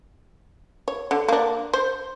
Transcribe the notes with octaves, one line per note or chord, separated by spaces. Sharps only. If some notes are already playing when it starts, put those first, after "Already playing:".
C#5
D3
A#3 D4
C5